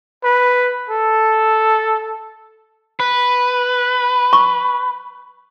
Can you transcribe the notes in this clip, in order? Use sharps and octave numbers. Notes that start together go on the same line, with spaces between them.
B4
A4
B4
C#6